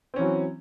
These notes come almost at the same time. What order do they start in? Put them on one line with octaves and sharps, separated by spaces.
C4 C#4 E3 F#3